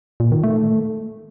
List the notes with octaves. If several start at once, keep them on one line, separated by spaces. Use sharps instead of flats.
A#2
D#3
A3